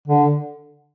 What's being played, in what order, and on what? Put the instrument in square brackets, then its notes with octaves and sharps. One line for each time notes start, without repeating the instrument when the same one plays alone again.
[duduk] D3